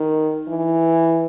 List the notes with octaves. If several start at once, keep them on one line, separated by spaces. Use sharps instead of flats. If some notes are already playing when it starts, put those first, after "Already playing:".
Already playing: D#3
E3